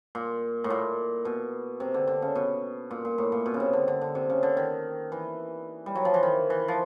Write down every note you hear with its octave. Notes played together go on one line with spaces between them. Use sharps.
A#2
A2
A#2
B2
C3
D3
D3
C#3
B2
A#2
A#2
A2
A#2
B2
C#3
C3
D3
D3
D3
C3
C#3
D3
D#3
E3
G3
F#3
F3
E3
D#3
E3
F3